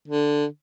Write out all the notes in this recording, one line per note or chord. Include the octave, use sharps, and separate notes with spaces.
D3